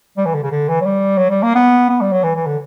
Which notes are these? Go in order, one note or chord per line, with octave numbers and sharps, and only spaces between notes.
G3
E3
D3
C#3
D3
E3
F#3
G3
F#3
G3
A#3
B3
B3
G3
F#3
E3
E3
D3